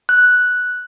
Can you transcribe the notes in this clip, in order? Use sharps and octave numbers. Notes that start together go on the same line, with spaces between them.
F#6